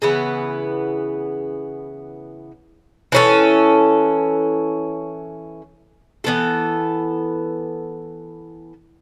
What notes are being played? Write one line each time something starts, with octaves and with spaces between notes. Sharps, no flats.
C#3 E3 B3
E3 C#4 A4
E3 B3 A4